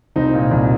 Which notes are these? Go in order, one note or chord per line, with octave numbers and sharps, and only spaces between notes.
C2 C4 D#4
A#2
C2